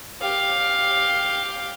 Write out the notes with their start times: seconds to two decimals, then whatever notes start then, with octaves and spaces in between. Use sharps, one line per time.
0.22 G4 F5